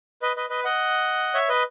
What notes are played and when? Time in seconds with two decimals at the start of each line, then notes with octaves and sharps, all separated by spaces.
0.22 B4 D#5
0.36 B4 D#5
0.50 B4 D#5
0.64 D#5 F#5
1.34 C#5 E5
1.49 B4 D#5